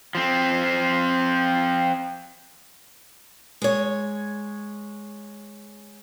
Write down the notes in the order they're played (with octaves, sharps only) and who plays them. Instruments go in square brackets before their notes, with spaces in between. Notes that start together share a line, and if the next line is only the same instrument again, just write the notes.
[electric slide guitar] F3 C4
[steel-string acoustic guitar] G#3 C#5